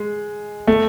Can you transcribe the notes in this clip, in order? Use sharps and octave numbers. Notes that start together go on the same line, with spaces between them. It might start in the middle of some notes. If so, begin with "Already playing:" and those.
Already playing: G#3
A3